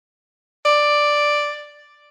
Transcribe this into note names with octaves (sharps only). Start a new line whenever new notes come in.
D5